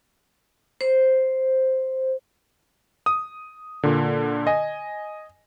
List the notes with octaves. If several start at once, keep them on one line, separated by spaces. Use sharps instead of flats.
C5
D#6
A#2 D3
D#5 G#5